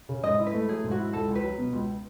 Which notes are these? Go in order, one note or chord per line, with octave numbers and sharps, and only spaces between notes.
C#3
G#2 D#5
E4
B4
A3
F#3 G#4
G#2
F#4
E4
C#2 A4
C#2
B4
F#3
B2
C#2